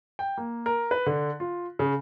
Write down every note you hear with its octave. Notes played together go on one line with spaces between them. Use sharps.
G5
A#3
A#4
B4
D3
F4
C#3